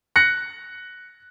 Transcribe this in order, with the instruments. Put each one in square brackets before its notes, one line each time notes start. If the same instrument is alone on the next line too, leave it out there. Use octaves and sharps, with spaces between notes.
[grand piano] F#6 A#6 C#7